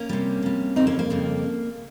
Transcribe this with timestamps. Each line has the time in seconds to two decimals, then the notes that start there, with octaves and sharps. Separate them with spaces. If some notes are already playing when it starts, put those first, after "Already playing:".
Already playing: A#3 C#4
0.09 C3 G3
0.43 C3 G3
0.76 F2 C#3 G3 C4 D#4
0.87 A#3 C#4
0.99 A#3
1.10 F2 C#3 G3